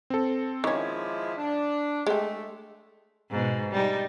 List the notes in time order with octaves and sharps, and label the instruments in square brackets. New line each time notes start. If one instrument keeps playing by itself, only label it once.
[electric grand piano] C4 A4
[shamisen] D#3 C#4 [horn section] F3 G#3 E4 [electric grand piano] D6 G#6
[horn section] D4
[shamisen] G#3 G4 [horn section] A3
[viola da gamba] G#2 B2
G3 D#4